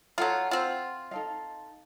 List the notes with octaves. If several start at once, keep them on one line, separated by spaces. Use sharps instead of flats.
F#3 F4 A4 F#5
C4 F4
D#4 A4 F5